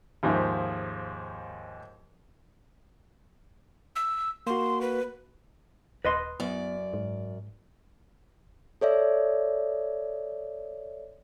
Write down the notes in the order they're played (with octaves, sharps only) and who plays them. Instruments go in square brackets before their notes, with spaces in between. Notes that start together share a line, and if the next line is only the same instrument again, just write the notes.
[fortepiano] D#2 G#2 F3 E5
[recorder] E6
[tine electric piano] A#3 F#4 [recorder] C6
[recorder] B4
[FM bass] D#1 [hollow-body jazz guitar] B4 D#5 C6
[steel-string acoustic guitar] F#2 D5 [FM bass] B3
[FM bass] G#2
[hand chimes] A4 C#5 D5 E5